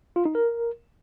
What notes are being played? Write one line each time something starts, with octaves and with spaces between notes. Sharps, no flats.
F4
D#4
A#4